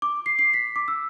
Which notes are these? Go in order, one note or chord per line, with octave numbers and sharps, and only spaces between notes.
D6
C7
C7
B6
D6
E6